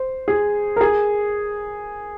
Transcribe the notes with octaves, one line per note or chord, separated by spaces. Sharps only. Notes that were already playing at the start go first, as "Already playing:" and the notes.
Already playing: C5
G#4
A#4
G#4